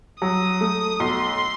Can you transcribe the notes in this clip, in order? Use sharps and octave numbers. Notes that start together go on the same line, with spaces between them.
F#3 D#6
A3
B1 C6